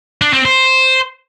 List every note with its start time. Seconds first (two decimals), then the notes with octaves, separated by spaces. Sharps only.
0.21 D4
0.33 C4
0.45 C5